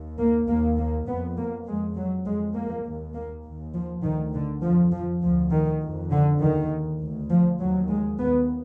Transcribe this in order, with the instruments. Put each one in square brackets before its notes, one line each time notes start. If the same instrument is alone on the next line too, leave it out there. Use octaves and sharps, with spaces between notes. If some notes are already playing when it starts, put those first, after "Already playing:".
Already playing: [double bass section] D#2
A#3
D#2 A#3
A#3
F2 B3
A#3
F2 G#3
F#3
F2 G#3
A#3
D#2
A#3
D#2
F3
D2 D#3
D3
F2 F3
F3
D2 F3
D#3
F2
D3
D#2 D#3
D2
F3
D#2 F#3
G#3
D#2 B3